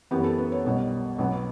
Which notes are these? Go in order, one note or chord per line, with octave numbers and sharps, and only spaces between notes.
F#2 E3 B3 G4
A4
B4
C#5
B1 B2 G3
B1 B2 F#3 B3